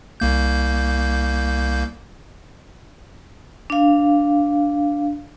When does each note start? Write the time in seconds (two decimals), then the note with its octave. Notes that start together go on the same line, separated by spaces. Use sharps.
0.20 C2 A#3 G6
3.70 D4 F5